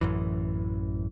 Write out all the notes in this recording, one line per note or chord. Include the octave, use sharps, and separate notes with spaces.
A1 F#2 E3